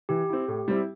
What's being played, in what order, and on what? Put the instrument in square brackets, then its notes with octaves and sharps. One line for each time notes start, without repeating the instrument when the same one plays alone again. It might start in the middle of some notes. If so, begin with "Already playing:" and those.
[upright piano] E3 [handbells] G4
[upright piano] C4 E4
A2
G3 C4 E4